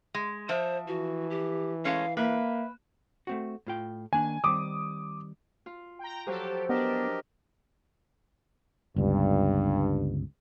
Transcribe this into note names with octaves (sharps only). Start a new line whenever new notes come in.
G#3
F3 C5 E5
E3 F#4
G4
G#3 A3 C#4 F5
A#3 B4 E5
A3 C4 F#4
A2 F4 G5
D#3 A#3 D4 G#5
D#3 G3 C4 D6 D#6
F4
G5 A#5
F3 F#3 G4 A4
B3 D4 G4 A#4 D#5
G1 C#2 G2